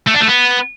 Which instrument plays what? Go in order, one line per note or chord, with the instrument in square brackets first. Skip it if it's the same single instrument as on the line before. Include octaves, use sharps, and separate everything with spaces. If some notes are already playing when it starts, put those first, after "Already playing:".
[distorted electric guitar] A3
D4
A3
B3